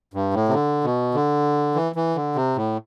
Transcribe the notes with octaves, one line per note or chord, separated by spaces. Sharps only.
G2
A2
C3
D3
B2
D3
E3
E3
D3
C3
A2